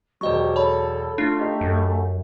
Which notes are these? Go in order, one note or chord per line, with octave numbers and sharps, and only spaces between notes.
E1 F#3 G4 C5 D#5 C#6
A4 C#5 A5 B5
A3 D4 F4
D#4 G4
F#2